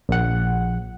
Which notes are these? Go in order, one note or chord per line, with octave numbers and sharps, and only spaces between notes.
A#1 F#5